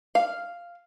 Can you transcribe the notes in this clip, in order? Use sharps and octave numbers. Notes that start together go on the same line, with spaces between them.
F5